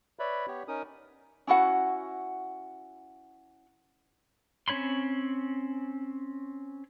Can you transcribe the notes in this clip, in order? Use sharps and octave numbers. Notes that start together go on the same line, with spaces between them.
B4 C#5 D5 E5 B5
B3 G4 C#5
C#4 D#4 A#4 D#6
C#4 E4 F#4 F#5
C4 C#4 C#5 B5 C6